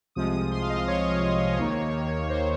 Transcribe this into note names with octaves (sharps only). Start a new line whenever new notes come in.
C2 C3 F3 G#3 D#6
D#6
C6
F5
D#5
C#5
D#2 D#3 A#3
C5